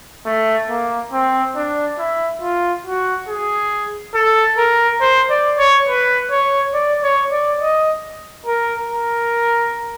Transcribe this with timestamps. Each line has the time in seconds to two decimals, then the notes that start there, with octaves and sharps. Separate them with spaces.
0.26 A3
0.70 A#3
1.12 C4
1.56 D4
1.99 E4
2.42 F4
2.86 F#4
3.28 G#4
4.14 A4
4.58 A#4
5.01 C5
5.30 D5
5.59 C#5
5.88 B4
6.31 C#5
6.74 D5
7.03 C#5
7.32 D5
7.61 D#5
8.46 A#4
8.89 A#4